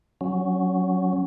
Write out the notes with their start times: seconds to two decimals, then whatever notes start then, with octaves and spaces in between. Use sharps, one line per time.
0.21 F#3 C#4